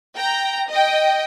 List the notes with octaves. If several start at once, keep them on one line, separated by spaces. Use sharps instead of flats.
G5 A#5
D#5 G5